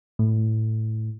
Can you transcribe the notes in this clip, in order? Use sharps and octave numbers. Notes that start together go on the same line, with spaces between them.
A2